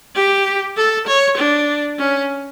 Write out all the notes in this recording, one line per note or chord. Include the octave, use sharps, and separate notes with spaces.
G4
A4
C#5
D4
C#4